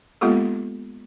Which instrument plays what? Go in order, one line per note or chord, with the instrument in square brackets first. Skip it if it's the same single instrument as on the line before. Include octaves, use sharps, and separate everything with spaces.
[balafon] G#3 A#3 B3 F4 G4 A4